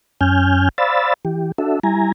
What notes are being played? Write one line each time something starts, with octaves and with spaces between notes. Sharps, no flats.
F#2 C#4 G#5 F6 G6
C5 D5 F5 B5 E6 A6
E3 G4
D4 F#4 A4 E5
G3 E4 G#5 A#5